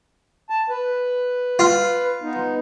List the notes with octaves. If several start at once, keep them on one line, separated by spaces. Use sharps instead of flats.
A5
B4
F4
B3 D#4